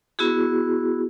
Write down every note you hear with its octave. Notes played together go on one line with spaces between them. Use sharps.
B3 E4 F#4 G#4